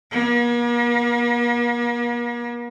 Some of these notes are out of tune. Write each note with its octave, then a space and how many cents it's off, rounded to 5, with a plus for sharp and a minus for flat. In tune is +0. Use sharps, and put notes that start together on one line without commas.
A#3 +45